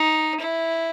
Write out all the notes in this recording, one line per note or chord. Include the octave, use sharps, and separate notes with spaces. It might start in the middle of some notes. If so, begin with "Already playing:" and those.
Already playing: D#4
E4